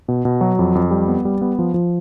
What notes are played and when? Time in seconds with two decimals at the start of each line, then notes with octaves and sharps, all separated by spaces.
0.08 B2
0.25 B2
0.41 F#3
0.59 F2
0.75 F2
0.91 G3
1.08 B3
1.25 G3
1.41 B3
1.59 F3
1.74 F3